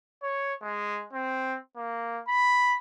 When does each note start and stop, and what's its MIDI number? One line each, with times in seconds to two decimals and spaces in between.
0.23 0.54 73
0.62 1.04 56
1.13 1.58 60
1.77 2.21 58
2.27 2.77 83